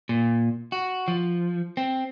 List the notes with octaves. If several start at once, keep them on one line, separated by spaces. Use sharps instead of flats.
A#2
F#4
F3
C4